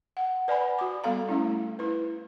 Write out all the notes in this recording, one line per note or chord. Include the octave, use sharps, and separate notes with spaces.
F#5
B4 D5 F#5 G#5 B5
F#4 D6
G3 B3 A4 F5 A#5
A3 C#4 E4
E4 B4